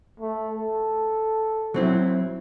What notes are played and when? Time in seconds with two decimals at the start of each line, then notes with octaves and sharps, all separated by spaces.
0.20 A3
0.55 A4
1.74 F#3 C4 E4